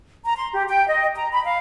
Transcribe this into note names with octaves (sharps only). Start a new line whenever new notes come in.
A#5
C6
G4
G5
D#5
A#5
B5
F5